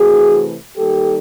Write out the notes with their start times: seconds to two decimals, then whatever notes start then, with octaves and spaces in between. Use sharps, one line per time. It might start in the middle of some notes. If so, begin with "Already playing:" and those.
Already playing: C3 E3 A3 F#4 G#4
0.77 D#3 G3 A#3 G4 A4